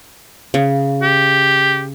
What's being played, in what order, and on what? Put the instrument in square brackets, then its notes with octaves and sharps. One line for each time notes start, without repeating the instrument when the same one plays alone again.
[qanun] C#3
[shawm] G4